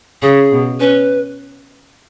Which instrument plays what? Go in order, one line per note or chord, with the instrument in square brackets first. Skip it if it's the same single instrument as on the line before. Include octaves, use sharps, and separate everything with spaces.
[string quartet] C#3 [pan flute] G#4
[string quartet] B2
[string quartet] C#4 [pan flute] B4